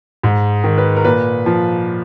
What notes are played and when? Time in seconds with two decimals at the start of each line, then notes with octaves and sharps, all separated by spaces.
0.23 G#2
0.64 D#3
0.78 B4
0.96 A#4
1.05 A#2 B4
1.46 F3